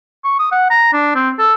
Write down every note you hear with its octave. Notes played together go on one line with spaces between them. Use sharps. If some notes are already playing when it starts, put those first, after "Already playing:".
C#6
D#6
F#5
A#5
D4
C4
A4